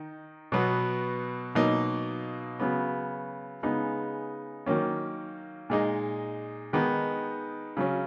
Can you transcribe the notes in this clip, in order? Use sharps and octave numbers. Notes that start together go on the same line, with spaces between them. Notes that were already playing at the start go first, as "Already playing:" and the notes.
Already playing: D#3 D#4
B2 F#3 B3
B2 F#3 A#3 D#4
C#3 F#3 B3
C#3 G#3 B3 D#4
D#3 F#3 A#3 C#4
A#2 G#3 D#4
D#3 G#3 B3 D#4
C#3 F#3 C#4